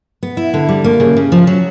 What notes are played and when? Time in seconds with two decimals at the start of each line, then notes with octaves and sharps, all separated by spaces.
0.23 B3
0.37 E4
0.54 D3
0.69 G3
0.84 A#3
1.00 C#3
1.17 C#3
1.32 F3
1.47 F#3